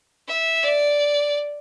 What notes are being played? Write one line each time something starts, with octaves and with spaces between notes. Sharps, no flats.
E5
D5